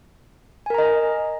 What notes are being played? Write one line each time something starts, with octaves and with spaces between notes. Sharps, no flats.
A#4 D#5 G#5 A#5